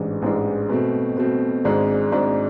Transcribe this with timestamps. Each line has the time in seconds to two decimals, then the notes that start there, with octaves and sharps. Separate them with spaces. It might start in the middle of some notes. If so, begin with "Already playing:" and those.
Already playing: A1 G#2 E3 G#3 D4
0.22 A1 G#2 E3 G#3 D4
0.69 B2 A3 C4
1.17 B2 A3 C4
1.65 G#1 G#2 G#3 D4
2.12 G#1 G#2 G#3 D4